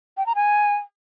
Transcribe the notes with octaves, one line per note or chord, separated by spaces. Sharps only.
G5
A#5
G#5